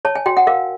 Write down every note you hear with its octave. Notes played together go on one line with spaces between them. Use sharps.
C#5 A5
G#5
F#4 G5
F#5
A#4 F5